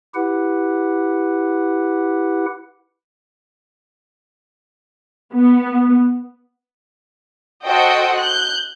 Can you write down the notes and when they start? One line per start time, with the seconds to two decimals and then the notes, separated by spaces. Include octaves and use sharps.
0.15 E4 G4 B4 F#5
5.35 B3
7.65 F#4 A4 C5 D#5 F#5 G5
8.18 F#6 G6